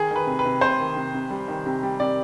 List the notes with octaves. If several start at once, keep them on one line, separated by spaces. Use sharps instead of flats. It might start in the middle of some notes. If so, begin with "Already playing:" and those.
Already playing: D#3 G#4
D#3
B4
C3
B4
C3
C3 C5
D#3
C3
C3
G3
D#3
C3
G3
C3 D5